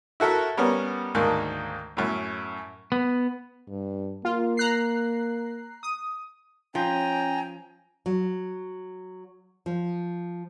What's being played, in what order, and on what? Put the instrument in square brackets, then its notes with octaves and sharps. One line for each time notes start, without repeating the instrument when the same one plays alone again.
[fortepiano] E4 F#4 A4 A#4 E5
G3 B3 C#4 A#4 F#5
D2 G#2 D#3 A#3 A5
F#2 A2
[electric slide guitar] B3
[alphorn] G2
[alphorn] A#3 [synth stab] F4
[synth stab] A#5 F#6 C7
D#6
[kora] F3 [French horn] C#4 [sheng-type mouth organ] G5 A#5 [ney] G#5
[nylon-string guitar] F#3
F3